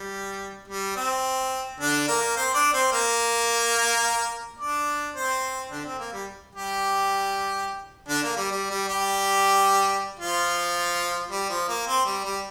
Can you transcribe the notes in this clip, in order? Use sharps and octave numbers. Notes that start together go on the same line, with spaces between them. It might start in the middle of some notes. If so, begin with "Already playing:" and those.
Already playing: G3
G3
C4
D3 D4
A#3 A#4
C4 C5
D4 D5
C4 C5
A#3 A#4
D4 D5
C4 C5
D3 D4
C4
A#3
G3
G3 G4
D3 D4
A#3
G3
G3
G3
G3 G4
F3 F4
G3
F3
A#3
C4
G3
G3